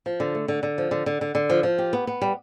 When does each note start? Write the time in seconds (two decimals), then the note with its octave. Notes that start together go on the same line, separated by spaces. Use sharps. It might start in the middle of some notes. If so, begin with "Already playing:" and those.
0.06 F3
0.20 D3
0.35 A3
0.48 D3
0.63 D3
0.78 F3
0.91 D3
1.06 D3
1.21 D3
1.35 D3
1.50 F3
1.63 F3
1.78 G4
1.93 B3
2.07 B3
2.22 G3